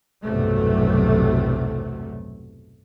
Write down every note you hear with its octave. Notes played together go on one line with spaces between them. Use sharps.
B1 E2 G2 C3 F#3 A3